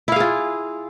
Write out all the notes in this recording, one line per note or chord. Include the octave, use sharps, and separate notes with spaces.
E4 F4 G#4 F5